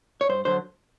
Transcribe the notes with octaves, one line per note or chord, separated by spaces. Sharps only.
C#5
G2 C5
D3 F#3 C5